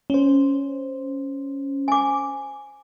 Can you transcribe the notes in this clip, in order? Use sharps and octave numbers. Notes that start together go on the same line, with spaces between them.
C#4 C5
G#5 D6